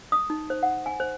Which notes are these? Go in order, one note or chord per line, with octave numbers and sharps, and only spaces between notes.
D#6
D#4
C5
F#5
G#5
C5